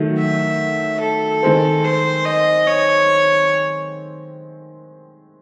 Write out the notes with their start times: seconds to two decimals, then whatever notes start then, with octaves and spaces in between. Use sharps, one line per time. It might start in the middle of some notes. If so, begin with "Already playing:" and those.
Already playing: D#3 F#3 A3
0.18 E5
1.00 A4
1.43 D#3 G#3 C4
1.84 C5
2.25 D#5
2.67 C#5